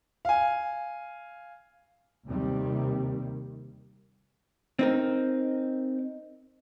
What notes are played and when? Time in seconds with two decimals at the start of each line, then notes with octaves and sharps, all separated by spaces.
0.25 F5 G#5
2.25 D#2 C3 D#3 G3
4.79 C4 D#4 A#4